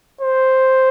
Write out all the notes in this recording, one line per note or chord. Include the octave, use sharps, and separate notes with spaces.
C5